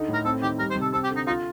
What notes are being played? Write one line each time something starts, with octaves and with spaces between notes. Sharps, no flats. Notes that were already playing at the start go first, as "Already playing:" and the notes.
Already playing: D3 D#4
A2
A#4
C4 A4
D#3 G4
G3 A#4
C5
C3
A4
C4 A4
G4
D3
D#4
D#4 F4